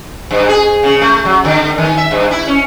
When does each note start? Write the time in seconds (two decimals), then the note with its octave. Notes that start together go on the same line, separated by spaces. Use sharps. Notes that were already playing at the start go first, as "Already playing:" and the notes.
0.31 G2
0.49 G#4
0.83 C#3
1.01 A3
1.25 F#3
1.45 D3
1.78 D#3
1.97 E5
2.11 G2
2.31 E4
2.47 C#4